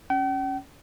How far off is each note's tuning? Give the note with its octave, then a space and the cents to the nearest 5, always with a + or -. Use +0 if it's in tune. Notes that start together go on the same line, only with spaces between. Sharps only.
C#4 +0 G5 -45